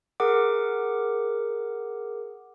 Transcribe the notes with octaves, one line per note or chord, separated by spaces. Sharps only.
G#4 A#4 F#5 D6